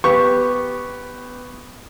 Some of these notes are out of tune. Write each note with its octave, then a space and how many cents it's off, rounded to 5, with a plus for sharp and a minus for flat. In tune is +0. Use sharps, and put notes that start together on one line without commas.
B3 +10 G4 +0 C#6 +0